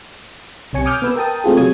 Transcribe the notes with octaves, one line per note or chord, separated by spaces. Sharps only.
B1 C3 C#5 G#5 C#7
G#5 D6 D#6 F6 G6
B3 B4 E6
A#4 G5 A5 D#6
A3 C4 F4 G#4
C3 F#3 G#4 C#5 D#6 G#6